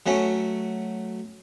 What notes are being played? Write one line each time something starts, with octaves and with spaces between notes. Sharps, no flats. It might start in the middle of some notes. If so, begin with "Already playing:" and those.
F#3 A3 C#4